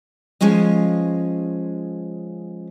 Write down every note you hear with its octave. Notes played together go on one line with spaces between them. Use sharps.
F3 G#3 C#4 F4 D#5